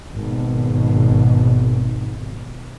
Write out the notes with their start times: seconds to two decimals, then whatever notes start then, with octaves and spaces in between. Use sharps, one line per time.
0.14 G#1 B2